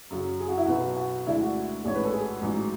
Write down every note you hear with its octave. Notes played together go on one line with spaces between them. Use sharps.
F#2 C#3 F#3
G#4
F#4
E4
B1 B2 F#3 B3 F#4
F#4
D2 D3 G#3 D4 E4
F#4
A1 G#2 G#3 D4 C#5
B4
A4
G#4
A1 G#2 F#3